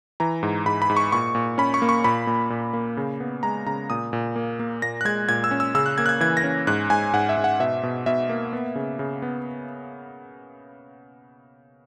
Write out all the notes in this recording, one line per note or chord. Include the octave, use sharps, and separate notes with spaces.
E3 A#5
G#2
G#2 B5
B5
G#2
C#6
A#2 C#6
A#2
C#4 B5
C#6
A#3
C#6
A#2 B5
A#2
A#2
A#3
C#3
B3
G#3 A#5
C#3 A#5
A#2 D#6
A#2
A#3
A#3
A#2 A#6
F#6
G#3 G#6
A#2 G#6
E6
C#4
E6
C#3 E6
F#6
A#3 G#6
F#6
G#6
E3 G#6
A#6
C#4
G#2 F#6
G#2 G#5
G#2 F#5
E5
G#2
F#5
B2 E5
B2
B2 E5
A#3
B3
C#3
C#3
B3